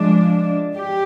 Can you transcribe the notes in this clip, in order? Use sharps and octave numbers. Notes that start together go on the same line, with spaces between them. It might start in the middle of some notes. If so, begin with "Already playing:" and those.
Already playing: F3 G#3 D4
G4